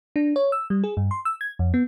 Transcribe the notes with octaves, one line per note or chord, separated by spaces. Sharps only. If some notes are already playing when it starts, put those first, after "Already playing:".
D4
C#5
E6
G3
G#4
G2
C6
E6
G#6
F2
B3